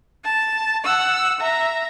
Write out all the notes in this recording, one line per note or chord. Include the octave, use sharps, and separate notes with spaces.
A5
F#5 E6
E5 A#5